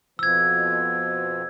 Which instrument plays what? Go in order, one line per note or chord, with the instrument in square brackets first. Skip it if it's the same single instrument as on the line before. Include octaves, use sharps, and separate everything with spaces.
[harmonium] F2 B2 F3 [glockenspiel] E6 G#6